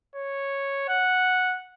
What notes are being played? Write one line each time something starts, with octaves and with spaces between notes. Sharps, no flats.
C#5
F#5